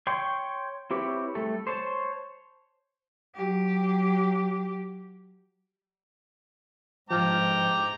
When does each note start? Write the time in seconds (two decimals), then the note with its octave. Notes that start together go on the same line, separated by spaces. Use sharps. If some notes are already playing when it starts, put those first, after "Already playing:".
0.07 C#5 G5 C6 C#6
0.90 C4 E4 G4 B4 C#5
1.35 G3 A3 A4
1.67 C5 C#5 A5
3.35 F#3 G4
7.11 G#2 F3 G5 A5 A#5 D6 F6